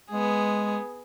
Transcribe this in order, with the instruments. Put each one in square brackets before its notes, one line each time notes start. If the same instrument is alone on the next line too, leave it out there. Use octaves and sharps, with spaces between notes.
[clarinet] G#3 [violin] B3 G#4